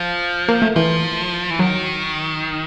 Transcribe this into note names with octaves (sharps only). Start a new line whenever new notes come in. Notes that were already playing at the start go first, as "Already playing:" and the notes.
Already playing: F3
A#3
A3
E3 F3
E3
D#3 F#3